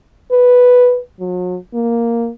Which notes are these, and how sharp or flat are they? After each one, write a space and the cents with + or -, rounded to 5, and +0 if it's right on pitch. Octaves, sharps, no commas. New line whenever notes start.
B4 +0
F#3 -40
A#3 +0